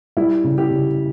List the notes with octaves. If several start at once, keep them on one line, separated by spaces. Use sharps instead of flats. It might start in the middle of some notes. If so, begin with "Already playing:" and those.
G3 E4
C#3
G4
C#3